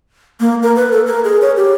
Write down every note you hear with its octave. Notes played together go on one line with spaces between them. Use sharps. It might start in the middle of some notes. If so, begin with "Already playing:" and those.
A#3
A#4
B4
A4
A#4
G#4
C#5
G4